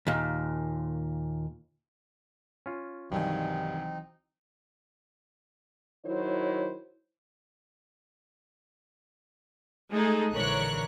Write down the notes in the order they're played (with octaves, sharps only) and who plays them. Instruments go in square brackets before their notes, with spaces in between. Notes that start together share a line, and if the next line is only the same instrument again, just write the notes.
[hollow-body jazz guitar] D#2 A#2
[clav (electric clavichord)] C#4 F4
[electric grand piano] C2 D#3 G#5 [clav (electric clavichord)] G2 [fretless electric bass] E3 F#3 [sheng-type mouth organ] C4 D#4
[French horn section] D#3 F#3 E4 C5 C#5
[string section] G#3 A3 D#4 G#4 A4
A#1 D3 E3 A#4 C#5 F#6